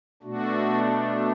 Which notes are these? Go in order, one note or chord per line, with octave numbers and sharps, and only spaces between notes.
B2 A3 D4 F#4